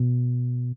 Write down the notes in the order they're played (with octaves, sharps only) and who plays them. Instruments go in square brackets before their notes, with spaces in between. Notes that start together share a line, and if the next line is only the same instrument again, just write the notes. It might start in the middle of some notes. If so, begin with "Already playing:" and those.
Already playing: [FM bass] B2